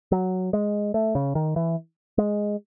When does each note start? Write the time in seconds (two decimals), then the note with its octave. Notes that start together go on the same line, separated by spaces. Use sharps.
0.12 F#3
0.53 G#3
0.94 A3
1.15 C#3
1.35 D#3
1.56 E3
2.18 G#3